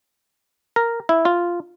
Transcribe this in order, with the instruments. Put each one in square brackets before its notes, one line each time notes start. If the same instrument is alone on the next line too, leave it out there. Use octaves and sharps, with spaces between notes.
[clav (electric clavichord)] A#4
E4
F4